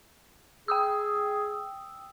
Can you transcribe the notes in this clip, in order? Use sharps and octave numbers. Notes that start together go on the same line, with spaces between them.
G#4 G5 D#6 E6